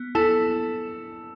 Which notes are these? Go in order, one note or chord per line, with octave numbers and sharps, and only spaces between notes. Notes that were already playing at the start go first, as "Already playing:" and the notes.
Already playing: B3
E4 A4